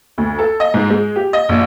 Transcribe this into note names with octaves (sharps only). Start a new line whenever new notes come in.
D2
A4
D#5
G#2
G#3
G4
D#5
A#1